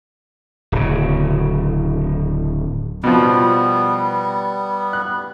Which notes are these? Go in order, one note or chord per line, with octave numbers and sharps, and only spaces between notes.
D1 C#3
B2 F3 G3 B3
F#6